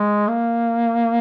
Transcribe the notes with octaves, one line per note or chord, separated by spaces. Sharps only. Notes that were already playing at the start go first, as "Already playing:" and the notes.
Already playing: G#3
A#3